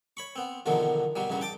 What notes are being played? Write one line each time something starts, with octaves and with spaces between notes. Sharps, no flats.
C#5 B5 C#6
B3 C4
B1 E2 D3 D#3 F3 F#3
B2 F#3 G3
A1 G2 C#3 F#3
G5 A5 D6